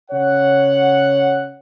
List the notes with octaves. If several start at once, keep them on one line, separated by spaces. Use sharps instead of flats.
C#3 C#5 F#5